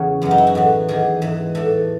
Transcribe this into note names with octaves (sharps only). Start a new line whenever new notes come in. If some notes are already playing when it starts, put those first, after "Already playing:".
Already playing: E2 C#3 C#4
F#2 E3 B3
D#4
E4
F#4
A2 E3
E2 D#3 G#4
G#2 E3
A2 E3 A4